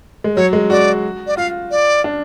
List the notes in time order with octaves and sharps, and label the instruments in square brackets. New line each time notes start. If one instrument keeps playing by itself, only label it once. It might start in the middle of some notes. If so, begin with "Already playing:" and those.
[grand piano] G#3
[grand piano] F#3 [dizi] C#5
[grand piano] G#3
[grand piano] F#4 [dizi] D5
[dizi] D5
[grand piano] F4 [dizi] F5
[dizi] D5
[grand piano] D4